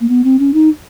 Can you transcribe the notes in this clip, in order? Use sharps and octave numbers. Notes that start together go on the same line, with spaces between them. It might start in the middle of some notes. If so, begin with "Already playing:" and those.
A#3
B3
C4
C#4
D#4